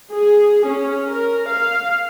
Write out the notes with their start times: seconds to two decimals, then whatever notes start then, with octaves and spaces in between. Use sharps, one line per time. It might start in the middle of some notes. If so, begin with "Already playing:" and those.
0.12 G#4
0.65 C#4
1.08 A#4
1.50 F5